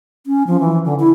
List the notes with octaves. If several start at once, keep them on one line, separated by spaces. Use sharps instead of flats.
C#4
F3
E3
D3
E4